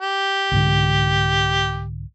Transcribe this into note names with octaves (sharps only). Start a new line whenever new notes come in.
G4
C2 G#2 D3